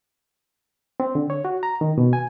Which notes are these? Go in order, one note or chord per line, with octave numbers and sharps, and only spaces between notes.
C4
D3
C#5
F#4
A#5
D#3
B2
G#5